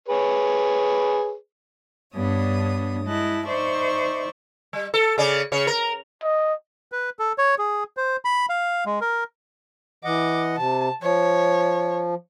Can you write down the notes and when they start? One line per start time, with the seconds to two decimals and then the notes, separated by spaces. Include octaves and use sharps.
0.09 G#4 B4 C#5
2.15 G2 B3 D4 C#5 D#6
3.05 G#3 E4 D#5 A5 F#6
3.46 D#4 C5 D5 E5 C#6
4.73 G3
4.94 A4
5.18 C#3 C#4 D5
5.52 C#3 C#5
5.67 A#4
6.23 D#5
6.92 B4
7.19 A4
7.38 C#5
7.58 G#4
7.97 C5
8.25 B5
8.49 F5
8.86 G#3
9.01 A#4
10.04 E3 D#5 F#5 D6
10.57 C3 A5
11.02 F3 C#5